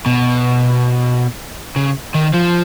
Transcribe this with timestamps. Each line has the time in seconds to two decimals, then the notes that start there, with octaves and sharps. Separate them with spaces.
0.06 B2
1.76 C#3
2.14 D#3
2.34 F3